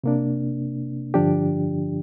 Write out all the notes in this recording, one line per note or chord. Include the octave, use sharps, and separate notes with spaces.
C3 A#3 D4
G2 D3 F3 D4 G4